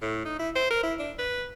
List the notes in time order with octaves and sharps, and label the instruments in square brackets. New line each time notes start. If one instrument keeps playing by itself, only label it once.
[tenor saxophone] A2
D#4
E4
C5
A#4
E4
D4
B4